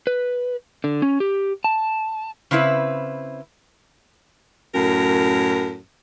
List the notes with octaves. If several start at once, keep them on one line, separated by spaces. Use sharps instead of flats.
B4
D3
C#4
G4
A5
C#3 C4 E4 B4
F#2 A2 A#4